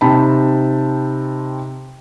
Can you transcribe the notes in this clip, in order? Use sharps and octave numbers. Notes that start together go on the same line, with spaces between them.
C3 C4 D#4 G5 A5 B5